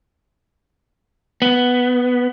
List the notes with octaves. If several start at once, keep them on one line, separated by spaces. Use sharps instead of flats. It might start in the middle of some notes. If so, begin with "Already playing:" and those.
B3